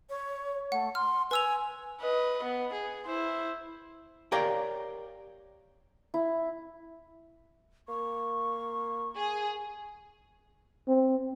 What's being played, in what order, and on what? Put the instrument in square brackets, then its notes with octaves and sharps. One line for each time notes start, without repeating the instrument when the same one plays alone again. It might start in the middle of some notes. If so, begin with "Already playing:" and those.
[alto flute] C#5
[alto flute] A3 [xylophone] F#5
[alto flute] C6 [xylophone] F6
[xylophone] B4 E6 F7 [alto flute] G#5
[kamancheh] B4 D#5
B3
G#4
E4 C5
[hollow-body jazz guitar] G4 A#4 C#5 D5 F5 G5
[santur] E4
[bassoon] A#3 [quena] C#6
[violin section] G#4
[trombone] C4